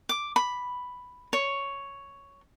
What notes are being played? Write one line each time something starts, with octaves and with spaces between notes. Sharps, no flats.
D6
B5
C#5